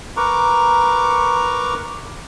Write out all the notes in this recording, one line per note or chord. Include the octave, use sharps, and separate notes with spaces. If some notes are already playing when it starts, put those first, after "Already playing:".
A#4 B4 A#5 C#6 D6